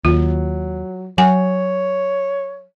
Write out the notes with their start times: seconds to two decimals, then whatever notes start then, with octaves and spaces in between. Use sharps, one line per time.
0.05 D#2 F#3 F4
1.18 F#3 C#5 F#5 G#5